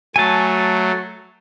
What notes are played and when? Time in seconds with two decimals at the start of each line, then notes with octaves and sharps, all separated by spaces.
0.16 F#3 A3 G#5 A5